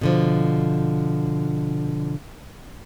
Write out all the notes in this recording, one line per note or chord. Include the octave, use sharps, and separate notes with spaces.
B2 D3 F3